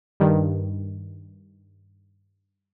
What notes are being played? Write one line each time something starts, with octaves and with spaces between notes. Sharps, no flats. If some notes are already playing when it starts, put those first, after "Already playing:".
G2 D#3